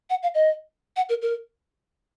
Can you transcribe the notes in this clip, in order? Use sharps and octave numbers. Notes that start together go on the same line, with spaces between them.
F#5
F5
D#5
F#5
A#4
A#4